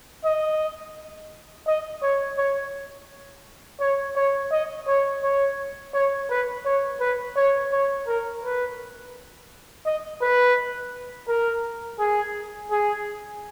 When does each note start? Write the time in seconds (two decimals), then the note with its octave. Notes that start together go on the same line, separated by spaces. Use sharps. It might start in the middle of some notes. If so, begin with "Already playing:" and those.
0.25 D#5
1.67 D#5
2.02 C#5
2.38 C#5
3.80 C#5
4.16 C#5
4.52 D#5
4.87 C#5
5.23 C#5
5.94 C#5
6.30 B4
6.65 C#5
7.00 B4
7.36 C#5
7.72 C#5
8.07 A#4
8.44 B4
9.86 D#5
10.21 B4
11.28 A#4
11.99 G#4
12.71 G#4